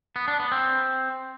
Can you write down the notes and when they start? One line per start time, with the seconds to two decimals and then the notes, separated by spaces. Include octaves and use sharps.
0.16 B3
0.28 D4
0.40 B3
0.52 C4